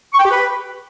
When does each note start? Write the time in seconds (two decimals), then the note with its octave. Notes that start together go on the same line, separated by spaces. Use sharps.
0.13 C#6
0.19 G5
0.25 G4
0.31 B4